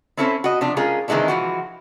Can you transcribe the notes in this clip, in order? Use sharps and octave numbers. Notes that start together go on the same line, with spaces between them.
C4 C#4 E4 A4 C5 C#5
F#4 D#5
C3 F3 D4
G#3 C#4 F4 G#4 A#4
C3 D#3 E3 G#3 C4 D4
E3 F3 F#4